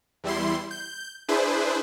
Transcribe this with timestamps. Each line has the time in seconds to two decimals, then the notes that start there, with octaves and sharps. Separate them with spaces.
0.24 E2 G3 E4 C6
0.71 G6
1.28 D4 E4 G#4 B4 C5